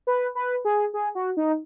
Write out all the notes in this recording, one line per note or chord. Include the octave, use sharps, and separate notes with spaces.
B4
B4
G#4
G#4
F#4
D#4